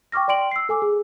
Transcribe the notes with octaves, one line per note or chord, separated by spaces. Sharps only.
G5 C#6 D6 F6 A#6
D5 G5 C6 D7 F#7
E6 C7
A4 G#5 D6 E6
G#4